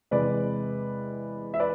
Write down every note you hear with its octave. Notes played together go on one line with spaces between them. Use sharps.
E2 C3 G#3 B4 D5
E5
B4 D5